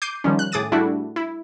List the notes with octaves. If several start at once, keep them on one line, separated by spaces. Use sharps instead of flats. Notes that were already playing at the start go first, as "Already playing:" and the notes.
D6 G6 C7 D#7
D#3 F3 G3 C#4
F#6
A2 G#4 D6 D#6 A6 D#7
G3 A3 D4 E4 F#4
E4